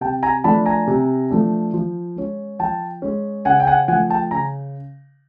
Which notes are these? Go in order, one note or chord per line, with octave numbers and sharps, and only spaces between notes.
C3 G5 A5
G#5 A#5
F3 A3 D4 A5 B5
G#5 A#5
C3
F3 A3 D4
F3
G#3 C#4
F3 G5 A5
G#3 C#4
C#3 F#5 G#5
G5
F#5 G#5
F3 A3 F#5 G#5
G5 A5
C#3 G#5 A#5